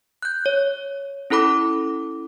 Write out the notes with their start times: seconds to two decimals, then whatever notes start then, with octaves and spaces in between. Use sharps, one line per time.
0.22 F#6 G6
0.46 C#5
1.30 C#4 E4 A4 B5 D6